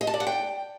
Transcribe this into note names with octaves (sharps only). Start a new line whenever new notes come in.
D#5
A5
D5
F#5
G5